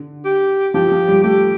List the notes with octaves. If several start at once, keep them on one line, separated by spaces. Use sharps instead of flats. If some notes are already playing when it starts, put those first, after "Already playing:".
Already playing: D3
G4
F3 G4
F3
G3
A3 G4